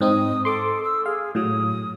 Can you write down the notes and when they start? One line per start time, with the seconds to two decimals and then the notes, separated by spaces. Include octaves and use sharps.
0.01 G#2 C4 D#4 D#6
0.45 A4 C6 D6
0.84 E6
1.06 G#4 F5
1.35 A2 F#3 D#6